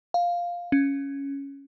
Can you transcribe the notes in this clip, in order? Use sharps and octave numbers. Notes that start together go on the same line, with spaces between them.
F5
C#4